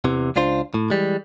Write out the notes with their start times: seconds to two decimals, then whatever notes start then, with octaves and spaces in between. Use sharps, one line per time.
0.04 E2 C3 E3
0.36 C#2 D4 F4 C5
0.74 A2
0.90 E3 G3 G#3